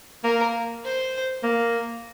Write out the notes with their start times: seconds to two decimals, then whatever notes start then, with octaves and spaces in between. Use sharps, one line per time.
0.24 A#3 A#4
0.84 C5
1.43 A#3